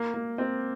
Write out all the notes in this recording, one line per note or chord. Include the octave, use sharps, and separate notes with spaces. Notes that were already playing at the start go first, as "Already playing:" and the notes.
Already playing: A#3
A#3
C4